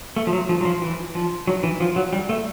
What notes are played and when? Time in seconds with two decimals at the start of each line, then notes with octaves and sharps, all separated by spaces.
0.16 A3
0.27 F3
0.33 F#3
0.49 F3
0.61 F#3
0.65 F3
0.82 E3
1.15 F3
1.47 F#3
1.63 E3
1.80 F3
1.96 F#3
2.13 G3
2.29 A3